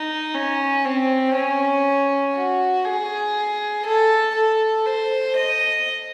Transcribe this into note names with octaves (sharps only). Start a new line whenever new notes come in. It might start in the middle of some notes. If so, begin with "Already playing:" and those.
Already playing: D#4
C#4
C4
C#4
F#4
G#4
A4
A4
C5
D#5